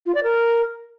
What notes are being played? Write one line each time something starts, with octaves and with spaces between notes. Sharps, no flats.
F4
D5
A#4